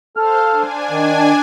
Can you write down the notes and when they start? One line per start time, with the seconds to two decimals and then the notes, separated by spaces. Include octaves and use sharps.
0.17 A4 C5 F5 F6
0.51 D4 G#5
0.90 D#3